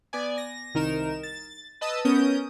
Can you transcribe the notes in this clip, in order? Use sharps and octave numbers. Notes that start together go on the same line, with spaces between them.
B3 D5 G#5
A#6
C2 D#3 D#4 A#4 E7
A6
B4 D#5 A5 D#6 E6
B3 C#4 A#4 D#6 G6